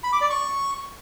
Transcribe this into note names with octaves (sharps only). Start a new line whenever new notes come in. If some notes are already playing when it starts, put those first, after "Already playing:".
B5
D6
D5
C#6